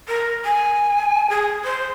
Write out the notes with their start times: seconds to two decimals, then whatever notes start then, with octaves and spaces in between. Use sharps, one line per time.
0.08 A#4
0.45 G#5
1.30 G#4
1.64 C5